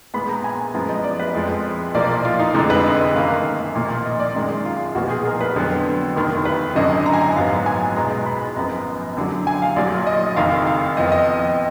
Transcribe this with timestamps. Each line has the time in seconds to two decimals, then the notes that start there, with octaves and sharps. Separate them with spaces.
0.14 A#1 A#2 G#3 B3 B5
0.29 A#5
0.44 G#5
0.74 F#2 F3 G#3 B3 A#5
0.89 D#5
1.04 D5
1.20 B4
1.34 F2 F3 G#3
1.94 B1 A#2 F3 A#3 D5
2.25 F4
2.39 D#4
2.54 F1 F2 D3 G#3 D#4
2.70 B4
2.84 D#5
3.00 D#5
3.14 F#2 D#3 A#3 F5
3.75 B1 A#2 F3 A#3
4.05 D#5
4.20 D5
4.35 F#2 D#3 G#3
4.65 F4
4.95 B1 A#2 F3 B3 F#4
5.10 G#4
5.25 A#4
5.41 B4
5.56 F2 D3 F#3 B3
6.16 F1 D#2 D#3
6.45 B4
6.75 G#1 F#2 D3 F#3 D#5
7.06 A#5
7.13 G#5
7.21 A#5
7.36 A#1 G#2 F#3 B3 F5
7.66 G#5
7.96 B1 B2 G#3 B3 A#5
8.26 B5
8.56 G#1 F#2 F3 B3 A#5
9.17 F#2 D3 F#3
9.47 G#5
9.62 F5
9.76 A#1 A#2 F#3 D5
10.07 D#5
10.36 F#1 F2 D#3 F5
10.67 F5
10.97 F2 F3 B3 D#5
11.12 D#5